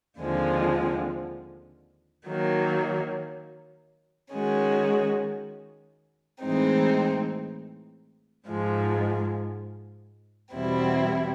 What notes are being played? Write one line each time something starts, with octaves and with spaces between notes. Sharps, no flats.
D#2 D3 F3 G#3 C4
D#3 F#3 A#3
D#3 G#3 C#4 F#4
A2 E3 G#3 C4 D#4
G#2 F3 G#3
E2 B2 G3 C4 E4